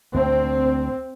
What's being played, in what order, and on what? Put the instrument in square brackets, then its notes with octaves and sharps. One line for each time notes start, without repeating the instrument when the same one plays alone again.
[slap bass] D2 [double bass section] C4